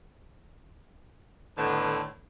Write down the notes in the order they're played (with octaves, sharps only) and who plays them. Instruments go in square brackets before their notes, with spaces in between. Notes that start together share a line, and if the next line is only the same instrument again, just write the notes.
[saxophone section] A2 D3 D#3 B3